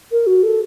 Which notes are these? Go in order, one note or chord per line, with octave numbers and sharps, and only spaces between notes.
A#4
F#4
A4